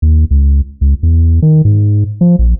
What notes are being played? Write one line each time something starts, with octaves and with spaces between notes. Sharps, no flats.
D#2
C#2
C#2
E2
D#3
G#2
F3
A#1